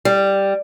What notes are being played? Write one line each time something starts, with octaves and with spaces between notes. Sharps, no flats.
G3